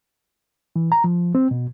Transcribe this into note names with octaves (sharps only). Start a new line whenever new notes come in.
E3
A#5
F3
C4
B2